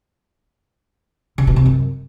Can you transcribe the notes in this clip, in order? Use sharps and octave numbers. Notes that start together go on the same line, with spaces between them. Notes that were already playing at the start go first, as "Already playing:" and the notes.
C#3
B2
C3
F#2